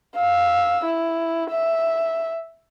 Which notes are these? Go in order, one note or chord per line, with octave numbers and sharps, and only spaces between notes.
F5 E6
E4
E5